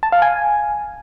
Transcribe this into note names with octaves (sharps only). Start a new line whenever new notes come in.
A5
F5
G#5